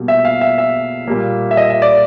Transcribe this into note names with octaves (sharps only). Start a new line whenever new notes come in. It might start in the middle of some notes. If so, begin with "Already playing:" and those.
Already playing: B2 G3 A#3
E5
F5
E5
E5
A#2 G3 A#3
E5
D#5
E5
D5